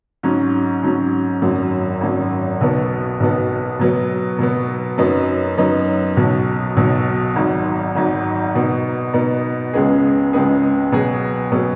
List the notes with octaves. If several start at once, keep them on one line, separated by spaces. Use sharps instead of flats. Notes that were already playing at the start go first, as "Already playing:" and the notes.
G#2 F#3 C#4
G#2 F#3 C#4
G#1 F#2 F#3
G#1 F#2 F#3
B1 B2 B3
B1 B2 B3
B2 F#3 B3
B2 F#3 B3
F#2 F#3 B3 D#4
F#2 F#3 B3 D#4
B1 B2 F#3
B1 B2 F#3
G#1 G#2 F#3
G#1 G#2 F#3
B2 B3 D#4
B2 B3 D#4
C#2 C#3 G#3 B3 G#4
C#2 C#3 G#3 B3 G#4
B2 F#3 B3 G#4
B2 F#3 B3 G#4